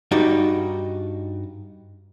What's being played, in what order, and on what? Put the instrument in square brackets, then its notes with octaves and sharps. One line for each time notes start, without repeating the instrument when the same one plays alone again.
[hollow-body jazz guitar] G2 D#4 F#4 D5